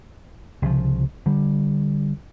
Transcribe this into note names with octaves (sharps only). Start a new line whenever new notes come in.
C2 C#3 F3
D3 G3